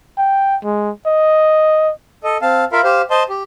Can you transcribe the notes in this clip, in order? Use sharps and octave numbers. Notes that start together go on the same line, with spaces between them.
G5
G#3
D#5
A4 D#5
C4 F5 A5
F4 A#4 E5 F5 B5
G4 C5 F5
C5 D#5 A5 C6
G4